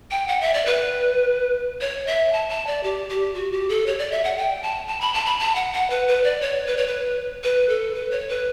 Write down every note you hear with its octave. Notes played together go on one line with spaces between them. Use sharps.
G5
F#5
E5
D5
B4
C#5
E5
A5
A5
D5
G4
G4
F#4
G4
A4
C#5
D5
E5
F#5
G5
A5
A5
B5
A5
B5
A5
F#5
F#5
B4
B4
D5
C#5
B4
C#5
B4
B4
A4
B4
C#5
B4